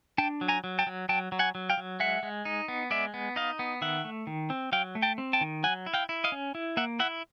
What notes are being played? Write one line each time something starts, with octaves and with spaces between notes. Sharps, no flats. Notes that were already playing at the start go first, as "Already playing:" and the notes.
D4 G5 A5
F#3
G#5 A#5
F#3
G5 A5
F#3
F#3 G5 A5
F#3
F#5 G#5
F#3
F5 G5
F#3
G#3 E5 F#5
G#3
D#4
B3
G#3 D5 E5
B3
D#4 D#5 F5
B3
D#3 E5 F#5
A3
D#3
C4
F#3 F5 G5
A3
G5 A5
C4
G5 A5
D#3
F#3 F#5 G#5
E4
F5 G5
E4
D#5 F5
C#4
E4
A#3 E5 F#5
E4 E5 F#5